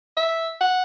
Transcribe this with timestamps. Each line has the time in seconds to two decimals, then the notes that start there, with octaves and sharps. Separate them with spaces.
0.17 E5
0.61 F#5